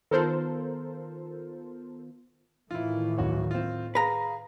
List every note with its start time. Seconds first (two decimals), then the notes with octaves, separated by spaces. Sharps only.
0.11 D#3 B3 F4 A4 A#4 C5
2.71 A2 D#3 E3 E4 F4
3.18 D1 F#4 C#5
3.51 C4 F4
3.95 G#4 B4 F5 A#5